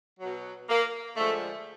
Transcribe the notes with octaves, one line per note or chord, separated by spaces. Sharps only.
B2 F#3
A#3
D3 F3 G#3 A3